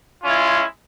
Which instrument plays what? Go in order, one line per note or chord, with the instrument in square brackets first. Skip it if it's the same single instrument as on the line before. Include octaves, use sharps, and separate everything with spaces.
[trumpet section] G#3 C#4 E4 F4